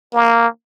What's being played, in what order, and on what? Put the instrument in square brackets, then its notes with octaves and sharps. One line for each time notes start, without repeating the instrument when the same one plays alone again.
[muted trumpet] A#3